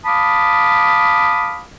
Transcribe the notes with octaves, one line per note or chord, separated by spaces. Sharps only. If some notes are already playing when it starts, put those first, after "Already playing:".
F5 A5 B5 D6 D#6